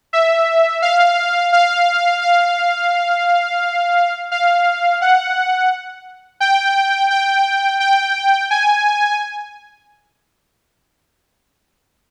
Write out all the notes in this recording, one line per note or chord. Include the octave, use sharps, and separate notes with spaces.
E5
F5
F5
F5
F5
F#5
G5
G5
G5
G#5